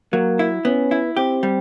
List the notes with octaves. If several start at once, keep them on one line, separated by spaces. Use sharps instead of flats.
F#3 A#3
E4
B3 C#4
E4
C4 G4
G3